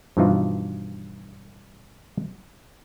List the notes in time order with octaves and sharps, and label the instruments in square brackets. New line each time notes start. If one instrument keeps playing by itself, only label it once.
[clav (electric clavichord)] G2 B2 E3 F3 D#4 F4